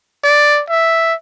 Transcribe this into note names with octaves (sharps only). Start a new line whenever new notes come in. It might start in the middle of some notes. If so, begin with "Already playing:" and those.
D5
E5